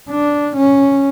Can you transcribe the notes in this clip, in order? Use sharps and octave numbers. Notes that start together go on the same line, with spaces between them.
D4
C#4